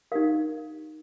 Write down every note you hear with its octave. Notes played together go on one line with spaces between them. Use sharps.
D#4 G4 A#4 F5